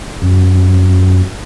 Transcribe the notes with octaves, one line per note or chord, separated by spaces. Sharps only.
F#2